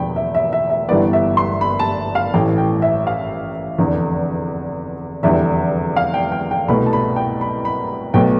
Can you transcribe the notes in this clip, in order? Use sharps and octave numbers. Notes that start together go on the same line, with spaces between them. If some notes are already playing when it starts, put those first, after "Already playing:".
Already playing: E1 E2 D3 F3 G5 B5
E5
E5
E5
E5
G1 G2 E3 G3 B3 D5
E5
C6
B5
A5
F5
A1 A2 E3 A3 G5
G5
E5
F5
F1 E2 D3
F1 E2 D3 G3 E5
F5
G5
G5
G5
C2 B2 A3 B5
A5
B5
G5
B5
B5
B1 B2 A3 G5